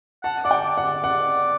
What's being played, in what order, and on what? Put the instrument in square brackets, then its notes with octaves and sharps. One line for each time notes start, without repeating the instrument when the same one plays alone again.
[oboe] F#5 [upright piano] A5
[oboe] D5 [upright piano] F#5
[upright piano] G5
[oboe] D5
[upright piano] F#5
[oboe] D5
[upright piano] F#5